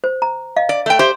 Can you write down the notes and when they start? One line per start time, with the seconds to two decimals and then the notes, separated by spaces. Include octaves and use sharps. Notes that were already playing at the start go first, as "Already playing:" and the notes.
0.04 C5
0.22 A#5
0.57 D#5 F5
0.69 D5
0.86 A3 G5
0.99 G4 C5 C6